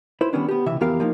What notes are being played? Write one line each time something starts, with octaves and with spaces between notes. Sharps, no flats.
E4 B4 C5
D#3 G3 B3 C#4 D4
B3 G4
C#2 C3 E3 E5
F2 E3 B3 G4 A#4 F5
F3 A#3 D#4